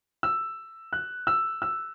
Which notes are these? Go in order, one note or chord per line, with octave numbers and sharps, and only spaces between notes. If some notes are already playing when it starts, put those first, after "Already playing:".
E6
F#6
E6
E6